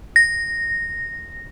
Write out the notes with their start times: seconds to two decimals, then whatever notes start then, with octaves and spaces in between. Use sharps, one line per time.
0.16 A#6